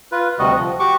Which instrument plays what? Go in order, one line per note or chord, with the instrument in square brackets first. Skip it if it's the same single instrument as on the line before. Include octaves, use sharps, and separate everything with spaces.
[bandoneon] F4 B4
D2 C3 G3 F#4 D#5
F3
F#4 G4 C#6 D6